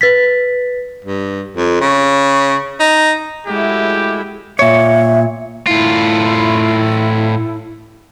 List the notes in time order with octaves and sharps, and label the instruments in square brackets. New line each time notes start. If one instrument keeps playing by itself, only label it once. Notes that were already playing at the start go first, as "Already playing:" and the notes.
[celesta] B4 A6 B6
[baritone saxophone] G2
F2
C#3
D#4
[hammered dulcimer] A2 F#3 [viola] G#3 E4 [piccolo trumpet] G4
[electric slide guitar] A#2 C#5 [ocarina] E5
[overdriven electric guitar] A2 F4 [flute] E4